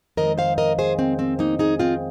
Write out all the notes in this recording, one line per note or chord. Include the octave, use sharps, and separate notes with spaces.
F2 D#3 G#3 A#4 D#5
C5 F5
A#4 D#5
G#4 C5
C4
C4
A#3 D#4
D#4 G#4
C4 F4